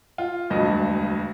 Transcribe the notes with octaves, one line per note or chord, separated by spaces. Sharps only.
F4
E1 D2 G2 D#5